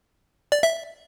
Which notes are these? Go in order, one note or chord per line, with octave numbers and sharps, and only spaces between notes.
D5
E5